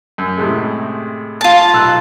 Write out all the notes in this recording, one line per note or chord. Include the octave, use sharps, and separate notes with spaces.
F#2
A2 C3 G#3
F4 A5
B1 E6 F#6